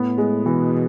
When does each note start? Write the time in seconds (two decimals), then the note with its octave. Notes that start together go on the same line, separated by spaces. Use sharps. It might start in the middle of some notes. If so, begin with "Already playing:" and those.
Already playing: A2 B3
0.18 G#3
0.45 B2 E3